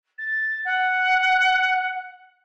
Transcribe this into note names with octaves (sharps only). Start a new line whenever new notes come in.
A6
F#5